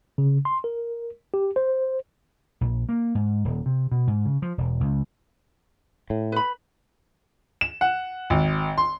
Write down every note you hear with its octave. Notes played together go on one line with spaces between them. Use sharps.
C#3
C6
A#4
G4
C5
A#1
A#3
G#2
D#1
C3
B2
G#2
C#3
F3
E1
C#2
A2
B4 B5
E7
F#5
G#1
C6